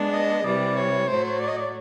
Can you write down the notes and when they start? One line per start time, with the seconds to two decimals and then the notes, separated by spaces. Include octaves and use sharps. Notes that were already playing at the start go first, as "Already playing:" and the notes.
Already playing: G#3 B3 D4
0.13 D#5
0.44 C3 E3 G3 D5
0.76 C#5
1.08 A2 F#3 A3 C5
1.24 C5
1.40 D5
1.48 D#5
1.57 D5